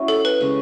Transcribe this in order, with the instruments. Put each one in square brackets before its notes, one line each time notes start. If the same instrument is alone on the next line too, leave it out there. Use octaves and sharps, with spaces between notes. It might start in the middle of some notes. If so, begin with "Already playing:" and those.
Already playing: [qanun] F#3 C#4 E4
[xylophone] A4
B4
[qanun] C#3 G#3 C#4